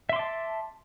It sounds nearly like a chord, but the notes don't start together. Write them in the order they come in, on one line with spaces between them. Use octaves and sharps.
E5 C6 D6 A5